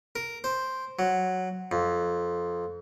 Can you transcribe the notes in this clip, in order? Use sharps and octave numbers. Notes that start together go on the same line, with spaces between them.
A#4
C5
F#3
F2